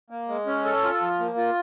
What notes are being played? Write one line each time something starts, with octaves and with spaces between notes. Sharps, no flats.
A#3
G#3
C#4
A4
F4
F3
A#3
F4